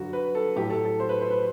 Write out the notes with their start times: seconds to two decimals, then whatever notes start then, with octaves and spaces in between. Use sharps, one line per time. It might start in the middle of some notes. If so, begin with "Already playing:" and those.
Already playing: G2 D3 F#3 F#4
0.13 B4
0.35 A4
0.56 A2 F#3 G4
0.70 A4
0.85 A4
1.00 C5
1.09 B4
1.21 C5
1.31 B4